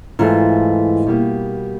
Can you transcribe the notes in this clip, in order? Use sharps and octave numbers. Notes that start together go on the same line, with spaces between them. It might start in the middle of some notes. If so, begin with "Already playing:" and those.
G#2 E3 A3 F4
B2 G3 A#3